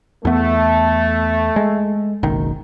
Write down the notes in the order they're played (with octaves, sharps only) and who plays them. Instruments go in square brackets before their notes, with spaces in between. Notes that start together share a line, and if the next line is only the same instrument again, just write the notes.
[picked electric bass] E2 B3 [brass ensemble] A3
[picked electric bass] G#3
F#1 B1 D#3